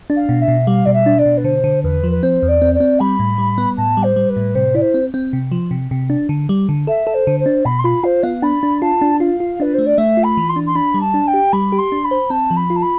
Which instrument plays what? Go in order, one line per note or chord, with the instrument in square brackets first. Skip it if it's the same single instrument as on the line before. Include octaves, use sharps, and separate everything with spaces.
[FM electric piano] D4
[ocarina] F5
[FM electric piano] B2
[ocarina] E5
[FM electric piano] B2
[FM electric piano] G3 [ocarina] F5
[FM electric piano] B2 [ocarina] D5
[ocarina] E5
[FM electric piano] D4
[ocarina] D5
[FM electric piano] B2
[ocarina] B4
[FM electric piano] D3 [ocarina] C5
[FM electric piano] D3
[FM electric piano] E2 [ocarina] B4
[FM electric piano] F3
[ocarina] B4
[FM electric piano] C4 [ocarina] C5
[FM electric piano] E2
[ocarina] D5
[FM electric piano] C4
[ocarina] D5
[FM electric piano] C4
[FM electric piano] G3 [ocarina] B5
[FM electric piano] A2
G3
B3
[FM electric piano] A2 [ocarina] A5
[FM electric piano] G3
[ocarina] C5
[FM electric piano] G3
[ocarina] B4
[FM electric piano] A2
[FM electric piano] C3 [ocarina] C5
[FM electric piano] E4 [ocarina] D5
[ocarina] C5
[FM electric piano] C4
C4
C3
F3
C3
C3
D4
D3
G3
D3
[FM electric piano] A4 [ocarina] E5
[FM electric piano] A4
[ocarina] C5
[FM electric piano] D3
[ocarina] C5
[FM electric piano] D4
[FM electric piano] B2 [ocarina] B5
[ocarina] C6
[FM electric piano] F4 [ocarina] B5
[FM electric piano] F4 [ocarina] C5
[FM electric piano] B3 [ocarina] F5
[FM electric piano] D4 [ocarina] B5
[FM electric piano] D4
[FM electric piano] F4 [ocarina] A5
[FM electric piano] D4
[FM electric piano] F4 [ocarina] F5
[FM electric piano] F4
[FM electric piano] D4 [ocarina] B4
[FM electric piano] A3 [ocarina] C5
[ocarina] D5
[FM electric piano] A3 [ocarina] E5
[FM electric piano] F4
[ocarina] B5
[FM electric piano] E3
[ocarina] C6
[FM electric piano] D4
[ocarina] C6
[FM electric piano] D4 [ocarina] B5
[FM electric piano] G3
[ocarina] A5
[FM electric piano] D4
[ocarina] G5
[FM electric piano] G4
[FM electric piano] G3 [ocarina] B5
[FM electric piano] G4
[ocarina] C6
[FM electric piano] D4
[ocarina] B5
[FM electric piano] C5
[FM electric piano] C4 [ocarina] A5
[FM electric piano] F3
[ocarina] B5
[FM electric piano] F4
[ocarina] A5
B5